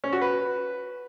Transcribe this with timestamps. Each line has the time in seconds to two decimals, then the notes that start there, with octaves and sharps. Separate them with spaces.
0.04 C#4
0.13 F#4
0.22 B4